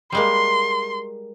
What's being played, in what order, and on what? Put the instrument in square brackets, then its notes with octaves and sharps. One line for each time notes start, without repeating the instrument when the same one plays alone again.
[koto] G3 G#3 A#3 [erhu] C6